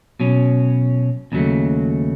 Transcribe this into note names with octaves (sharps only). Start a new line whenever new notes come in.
B2 F#3 C#4
D#2 C#3 F#3 A3